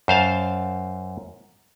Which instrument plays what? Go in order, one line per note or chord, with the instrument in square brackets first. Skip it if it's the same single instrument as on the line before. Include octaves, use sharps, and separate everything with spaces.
[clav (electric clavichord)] F#2 C5 F5 A5